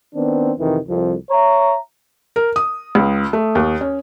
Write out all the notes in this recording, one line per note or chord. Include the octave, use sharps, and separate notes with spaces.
D#3 B3 C4 D4
F2 C3 D#3 E3
C2 F2
C#5 E5 A#5
A#4
D#6
C#2
A3
D#2
C#4